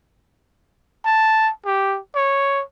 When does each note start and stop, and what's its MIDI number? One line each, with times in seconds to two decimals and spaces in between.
1.05 1.51 81
1.65 1.99 67
2.15 2.63 73